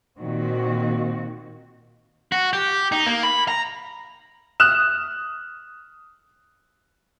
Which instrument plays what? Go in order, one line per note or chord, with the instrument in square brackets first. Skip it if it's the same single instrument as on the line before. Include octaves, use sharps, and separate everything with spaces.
[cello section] A#2 D#3 C4 F#4
[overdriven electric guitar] F#4
G4
D#4
A#3
B5
A#5
[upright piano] D#6 F6 F#6 E7